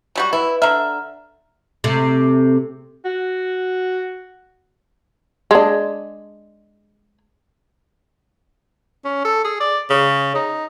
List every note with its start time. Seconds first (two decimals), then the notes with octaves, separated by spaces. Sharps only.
0.15 F#3 G3 F#4
0.33 E4 B4
0.62 D3 E5 A#5 F6
1.84 C3 A3
3.05 F#4
5.51 G#3 D4
9.05 C#4
9.25 A4
9.44 G#4
9.60 D5
9.90 C#3
10.35 D#4